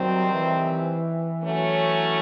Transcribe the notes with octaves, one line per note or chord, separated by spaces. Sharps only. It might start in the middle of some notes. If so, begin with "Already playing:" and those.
Already playing: C3 D#3 F#3 G3 C4
E3
F#3 A3 C#4